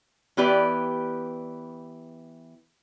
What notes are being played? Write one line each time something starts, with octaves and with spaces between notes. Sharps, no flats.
E3 B3 G4 B4 D5